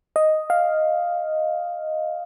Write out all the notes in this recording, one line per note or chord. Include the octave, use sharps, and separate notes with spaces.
D#5
F5